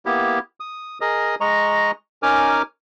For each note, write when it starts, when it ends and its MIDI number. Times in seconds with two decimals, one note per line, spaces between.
0.06 0.39 58
0.06 0.39 59
0.06 0.39 64
0.06 0.39 67
0.60 0.98 87
1.01 1.35 68
1.01 1.35 70
1.01 1.35 75
1.01 1.35 87
1.41 1.91 56
1.41 1.91 75
1.41 1.91 82
1.41 1.91 85
2.23 2.62 61
2.23 2.62 63
2.23 2.62 70
2.23 2.62 80
2.23 2.62 86
2.23 2.62 89